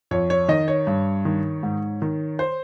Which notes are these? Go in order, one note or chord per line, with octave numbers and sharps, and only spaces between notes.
F2 C#5
C#5
D#3 D#5
C#5
G2
D#3
G#2
D#3
C5